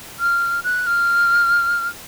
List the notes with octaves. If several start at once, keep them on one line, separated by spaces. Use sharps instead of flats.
F6
F#6
F6